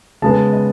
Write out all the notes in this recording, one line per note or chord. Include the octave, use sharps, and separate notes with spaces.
C#3 G#3 B3 A5
D#5